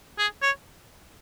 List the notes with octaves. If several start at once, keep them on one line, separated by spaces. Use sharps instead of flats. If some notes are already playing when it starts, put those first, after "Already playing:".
G#4
C#5